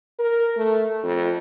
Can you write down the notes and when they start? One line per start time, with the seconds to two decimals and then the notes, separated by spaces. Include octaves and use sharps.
0.19 A#4
0.57 A3
1.03 F2